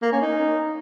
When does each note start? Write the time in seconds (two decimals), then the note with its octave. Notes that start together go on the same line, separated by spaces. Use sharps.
0.02 A#3
0.12 C#4
0.22 D#4